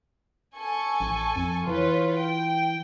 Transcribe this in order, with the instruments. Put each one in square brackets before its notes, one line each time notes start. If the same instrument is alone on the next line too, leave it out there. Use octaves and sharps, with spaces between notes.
[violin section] A4 G#5 C#6
[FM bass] A1
F2
[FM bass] E3 [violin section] F4 B4 C#5
[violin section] G5